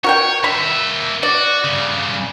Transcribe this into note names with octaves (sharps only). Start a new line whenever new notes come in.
F#4 A#4 C#5 G5
A#3 E5 B5
F#4 D5
G2 C#3